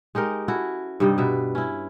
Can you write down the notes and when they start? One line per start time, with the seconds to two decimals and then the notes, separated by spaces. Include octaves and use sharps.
0.15 G#3 D#4 G4 A#4
0.48 C#4 E4 F#4 A4
1.00 G2 C3 G3 D#4
1.18 B2 B4 E5
1.55 C#4 E4